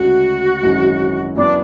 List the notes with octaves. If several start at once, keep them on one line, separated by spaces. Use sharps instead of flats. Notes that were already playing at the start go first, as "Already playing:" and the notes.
Already playing: D2 C#3 G#3 C#4 F#4
G#1 F#2 E3 G#3 C#4
F#2 E3 B3 D4